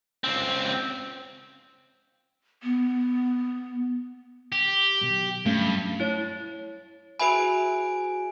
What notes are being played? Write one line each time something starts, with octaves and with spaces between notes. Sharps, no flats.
C#2 C4
B3
G4
B2 D#3 F#3
G2 F#3 A3 C#4
E4 C#5
E4 F#4 G#4 B4 E5 G#5 B5 D7